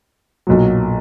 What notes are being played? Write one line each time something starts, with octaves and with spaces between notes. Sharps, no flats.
B1 A#2 F#3